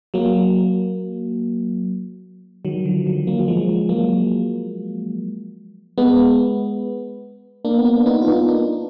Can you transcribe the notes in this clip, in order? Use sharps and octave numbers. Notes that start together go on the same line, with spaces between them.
F#3 A#3
D#3 F#3
D3 F3
D#3 F#3
F#3 A#3
F#3
F3 G#3
F#3 A#3
G#3 B3
A#3 D4
B3
A#3 D4
B3 D#4
F4
B3 D#4
A#3 D4